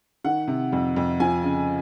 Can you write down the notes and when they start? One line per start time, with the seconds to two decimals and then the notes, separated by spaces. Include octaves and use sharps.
0.25 D#3 F#5
0.48 C3
0.73 F2
0.96 F2
1.20 F3 G#5
1.43 C#3